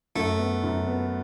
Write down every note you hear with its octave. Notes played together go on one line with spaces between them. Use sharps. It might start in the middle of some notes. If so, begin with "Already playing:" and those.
F#2 A3
B3
F#2
B3